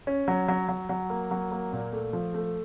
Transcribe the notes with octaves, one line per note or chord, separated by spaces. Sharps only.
C#4
F#3
F#3
F#3
F#3
A#3
F#3
A#3
A#2
A3
F3
A3